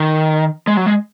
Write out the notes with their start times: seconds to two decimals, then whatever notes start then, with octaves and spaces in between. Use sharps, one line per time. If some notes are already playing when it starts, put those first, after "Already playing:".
Already playing: D#3
0.67 G#3
0.77 F#3
0.86 G#3